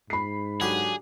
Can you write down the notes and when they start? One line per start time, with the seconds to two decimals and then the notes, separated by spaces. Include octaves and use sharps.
0.10 G#2 B5 C7
0.61 D3 F#3 G4 G#4